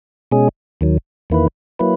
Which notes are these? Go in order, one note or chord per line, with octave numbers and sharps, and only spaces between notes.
B2 G#3 C#4 G#4
D#2 D#3 F#3
E2 D#3 A#3 E4 B4
F#3 A#3 E4 B4